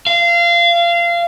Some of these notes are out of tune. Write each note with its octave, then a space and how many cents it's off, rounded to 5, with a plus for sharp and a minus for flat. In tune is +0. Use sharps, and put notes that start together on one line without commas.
F5 -25